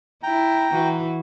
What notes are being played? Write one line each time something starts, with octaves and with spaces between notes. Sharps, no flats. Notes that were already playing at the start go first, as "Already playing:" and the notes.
E4 G5 A#5
E3 F#4